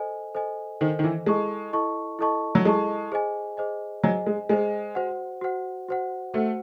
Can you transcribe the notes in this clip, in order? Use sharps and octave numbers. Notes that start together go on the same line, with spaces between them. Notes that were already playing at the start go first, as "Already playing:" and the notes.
Already playing: A4 C5 D#5 G#5
A4 C5 D#5 G#5
D#3 A4 C5 D#5 G#5
D#3
E3
G#3 E4 A4 D#5 A5 C#6
E4 A4 D#5 A5 C#6
E4 A4 D#5 A5 C#6
F#3
G#3 E4 A4 D#5 A5 C#6
G#4 C5 D#5 G#5
G#4 C5 D#5 G#5
F#3 G#4 C5 D#5 G#5
G#3
G#3 G#4 C5 D#5 G#5
F#4 C5 F#5
F#4 C5 F#5
F#4 C5 F#5
A3 F#4 C5 F#5